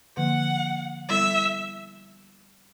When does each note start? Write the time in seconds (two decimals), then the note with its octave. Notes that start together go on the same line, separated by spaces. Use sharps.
0.17 D3 F3 A#3 F#5
1.08 G3 B3 E4 A4 E5